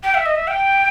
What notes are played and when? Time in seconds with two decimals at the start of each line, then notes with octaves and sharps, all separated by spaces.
0.03 G5
0.14 E5
0.26 D#5
0.36 E5
0.47 G5